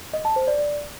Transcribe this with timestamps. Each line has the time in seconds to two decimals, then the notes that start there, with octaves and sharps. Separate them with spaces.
0.13 D#5
0.25 A5
0.36 C5
0.48 D5